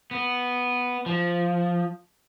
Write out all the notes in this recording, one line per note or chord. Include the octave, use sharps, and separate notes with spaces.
B3
F3